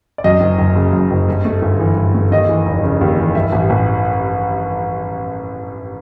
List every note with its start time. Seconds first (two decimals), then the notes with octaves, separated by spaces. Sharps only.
0.18 D5
0.24 F#2 D#5
0.41 F#1
0.58 F#1
0.76 C#3
0.93 F#2
1.11 F#1
1.28 G2
1.45 A3
1.62 G1
1.80 E3
1.97 G2
2.14 A3
2.31 D#2 D#5
2.49 E3
2.66 F1
2.84 C#3
3.01 D#2
3.18 E3
3.35 G2 E5
3.52 A1
3.70 A1